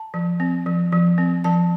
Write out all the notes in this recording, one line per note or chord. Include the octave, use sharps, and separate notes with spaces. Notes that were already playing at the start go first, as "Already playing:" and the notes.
Already playing: A5
F3
C4
F3
F3
C4
F3 A5